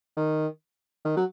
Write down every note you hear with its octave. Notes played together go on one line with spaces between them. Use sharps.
D#3
D#3
F#3